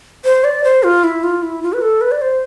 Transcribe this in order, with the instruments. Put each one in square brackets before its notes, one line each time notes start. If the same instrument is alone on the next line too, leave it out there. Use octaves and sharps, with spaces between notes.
[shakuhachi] C5
D5
C5
F4
E4
F4
E4
F4
B4
A4
B4
D5
C5